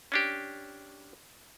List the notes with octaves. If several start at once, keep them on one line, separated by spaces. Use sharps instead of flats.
C#4 D4 G4